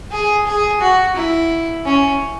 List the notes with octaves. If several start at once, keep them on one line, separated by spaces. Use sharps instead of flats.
G#4
G#4
F#4
E4
C#4